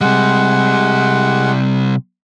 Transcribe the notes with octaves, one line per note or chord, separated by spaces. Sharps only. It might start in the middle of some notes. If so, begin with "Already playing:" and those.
C3 G3 G#3 F#5